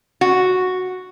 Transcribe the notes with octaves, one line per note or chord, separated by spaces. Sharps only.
F#4